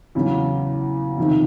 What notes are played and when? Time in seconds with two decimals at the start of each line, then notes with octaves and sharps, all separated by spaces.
0.15 E2 C#3 F#3
1.18 F2 C3 D#3